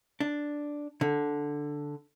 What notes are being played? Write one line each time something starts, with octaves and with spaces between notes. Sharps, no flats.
D4
D3